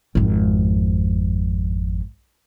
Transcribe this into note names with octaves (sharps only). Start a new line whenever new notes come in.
G#1 F2